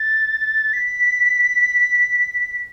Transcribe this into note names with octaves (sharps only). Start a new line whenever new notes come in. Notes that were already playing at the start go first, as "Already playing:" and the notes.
Already playing: A6
B6